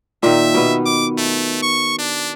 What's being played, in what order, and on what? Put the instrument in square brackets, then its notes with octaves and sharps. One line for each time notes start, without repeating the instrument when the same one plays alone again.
[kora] A#2 D#3 [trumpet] E5
[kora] B2 B3
[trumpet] D6
A3
C#6
D4